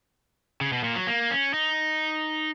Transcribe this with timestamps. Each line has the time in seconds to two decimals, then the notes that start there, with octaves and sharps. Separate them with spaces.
0.61 C#3
0.73 B2
0.84 A#2
0.96 F#3
1.07 A#3
1.31 C#4
1.54 D#4